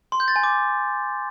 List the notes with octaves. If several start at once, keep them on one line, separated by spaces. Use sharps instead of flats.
C6
G6
A6
G#5
D6